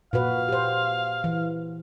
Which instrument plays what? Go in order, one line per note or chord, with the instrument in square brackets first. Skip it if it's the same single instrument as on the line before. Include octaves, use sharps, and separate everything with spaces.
[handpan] A#2 F#4 B4 [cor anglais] F5
[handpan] G4 C5
E3